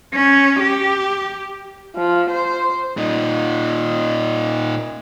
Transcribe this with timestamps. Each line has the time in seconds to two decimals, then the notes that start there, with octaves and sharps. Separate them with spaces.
0.13 C#4
0.60 G4
1.96 F3
2.30 C5
2.97 A#2 D#4